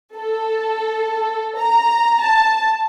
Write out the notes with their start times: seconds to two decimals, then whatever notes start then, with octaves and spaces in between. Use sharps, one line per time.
0.16 A4
1.57 A#5
2.23 A5